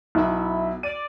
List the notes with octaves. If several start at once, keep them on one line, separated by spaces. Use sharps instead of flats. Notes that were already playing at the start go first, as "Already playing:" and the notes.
B1 E4
D5 D#7